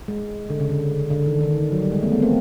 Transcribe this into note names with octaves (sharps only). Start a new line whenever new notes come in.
G#3
D3
C#3
D3
D3
D#3
D#3
F#3
G3
G#3
A3 B3
A3 B3
A#3 C4